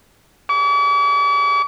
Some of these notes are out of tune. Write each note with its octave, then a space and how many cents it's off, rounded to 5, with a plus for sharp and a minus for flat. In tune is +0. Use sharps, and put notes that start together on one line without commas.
D6 -45